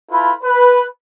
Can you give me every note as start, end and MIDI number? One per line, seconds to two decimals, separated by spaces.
0.12 0.32 64
0.12 0.32 65
0.12 0.32 69
0.12 0.32 71
0.12 0.32 83
0.44 0.84 71